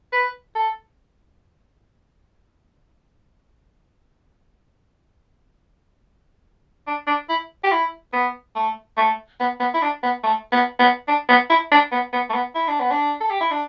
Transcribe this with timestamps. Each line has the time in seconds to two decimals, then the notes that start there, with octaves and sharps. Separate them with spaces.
0.13 B4
0.55 A4
6.87 D4
7.07 D4
7.29 E4
7.64 G4
7.72 E4
8.13 B3
8.56 A3
8.97 A3
9.40 B3
9.60 B3
9.74 E4
9.82 D4
10.03 B3
10.23 A3
10.52 B3
10.79 B3
11.08 D4
11.29 B3
11.50 E4
11.72 D4
11.92 B3
12.13 B3
12.29 A3
12.34 B3
12.55 E4
12.68 D4
12.80 B3
12.91 D4
13.21 A4
13.30 G4
13.41 E4
13.51 D4